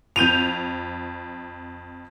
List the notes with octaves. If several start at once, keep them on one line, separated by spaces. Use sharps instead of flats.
F2 G6 D#7 F7